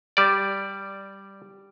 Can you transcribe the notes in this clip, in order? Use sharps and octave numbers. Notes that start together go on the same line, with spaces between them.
G3 D5